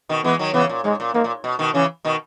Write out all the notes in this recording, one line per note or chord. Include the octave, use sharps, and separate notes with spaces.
B2 D#3
E3 G#3 B3
D#3 F#3
C#3 E3 B3
A#2
G#2 G#3
A#2
G#2 A#3
A#2
B2
B2 D#3
C#3 E3 C#4
B2 D#3